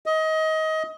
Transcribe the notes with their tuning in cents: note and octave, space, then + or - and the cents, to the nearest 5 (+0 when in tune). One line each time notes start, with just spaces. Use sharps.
D#5 +25